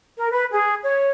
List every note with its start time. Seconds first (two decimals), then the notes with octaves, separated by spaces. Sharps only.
0.18 A#4
0.31 B4
0.52 G#4
0.83 C#5